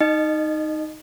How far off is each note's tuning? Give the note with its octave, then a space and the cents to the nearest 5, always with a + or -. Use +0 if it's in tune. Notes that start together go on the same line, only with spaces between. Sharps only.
D#4 +0 D#5 -25